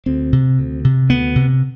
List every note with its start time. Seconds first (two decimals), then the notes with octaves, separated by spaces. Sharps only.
0.06 D2 C4
0.32 C3
0.59 D2
0.84 C3
1.09 D2 B3
1.35 C3